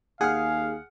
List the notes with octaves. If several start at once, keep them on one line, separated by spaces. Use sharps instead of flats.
D#2 G#4 F5 F#5 F6